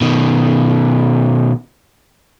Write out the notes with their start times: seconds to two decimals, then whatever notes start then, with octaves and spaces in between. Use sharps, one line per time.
0.01 B2 D#3